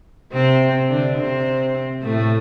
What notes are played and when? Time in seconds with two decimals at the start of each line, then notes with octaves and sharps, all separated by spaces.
0.32 C3 C4
0.89 D3 D4
1.18 C3 C4
2.03 A2 A3